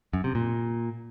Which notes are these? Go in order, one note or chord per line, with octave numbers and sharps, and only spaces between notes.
F#2
C3
A#2